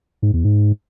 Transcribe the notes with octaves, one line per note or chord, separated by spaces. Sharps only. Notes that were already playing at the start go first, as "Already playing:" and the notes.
G#2
E2
G#2